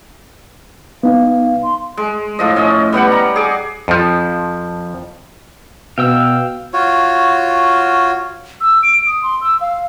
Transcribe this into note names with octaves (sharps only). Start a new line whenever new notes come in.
B3 D#4 F5
C6
G#3
A2 F3 D#5
C#4 D#5
G3 B3 G4 F#5
A#5
G#4 D6
F2 F3
B2 F5 G5 E6
F4 F#4 C#5
E6
D7
D#6
C6
E6
F5